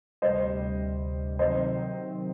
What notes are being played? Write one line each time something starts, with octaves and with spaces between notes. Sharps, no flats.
D2 C3 G3 C5 D#5
C3 D#3 F#3 C4 C5 D#5